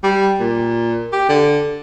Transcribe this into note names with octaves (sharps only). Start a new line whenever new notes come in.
G3
A#2
G4
D3